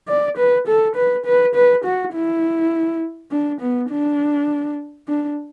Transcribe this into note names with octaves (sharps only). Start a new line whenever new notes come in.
D5
B4
A4
B4
B4
B4
F#4
E4
D4
B3
D4
D4